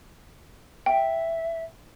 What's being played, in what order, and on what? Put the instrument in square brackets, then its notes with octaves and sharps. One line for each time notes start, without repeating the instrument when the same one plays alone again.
[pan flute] E5 [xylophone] G5